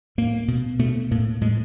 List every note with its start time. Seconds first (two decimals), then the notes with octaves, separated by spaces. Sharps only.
0.18 A2 A#3
0.48 B2
0.79 B2 A3
1.11 A2 A#3
1.41 A2 G#3